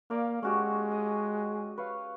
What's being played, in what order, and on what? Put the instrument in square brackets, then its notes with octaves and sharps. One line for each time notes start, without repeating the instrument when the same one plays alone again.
[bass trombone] A#3 [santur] D5 F5
[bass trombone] G#3 [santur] C#4 F#4 G4
[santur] D#5
B4 C#5 F5